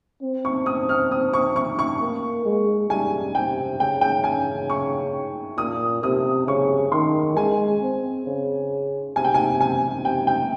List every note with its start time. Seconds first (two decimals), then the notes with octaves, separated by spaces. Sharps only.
0.22 C4
0.45 C#6
0.66 D#6
0.89 F6
1.11 D#6
1.33 C#6
1.56 C#6
1.79 C#6
2.01 A#3
2.45 G#3
2.90 G3 G#5
3.35 C3 G5
3.80 C#3 G5
4.01 G5
4.24 G#5
4.70 C#6
5.58 A#2 D#6
6.03 C3 D#6
6.47 C#3 C#6
6.92 D#3 C6
7.37 G#3 G#5
7.82 C4
8.26 C#3
9.16 C3 G#5
9.24 G5
9.34 G#5
9.61 G#5
10.05 C3 G5
10.27 G5